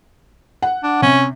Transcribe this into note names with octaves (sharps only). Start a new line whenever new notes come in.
F#5
D4
C3 C#4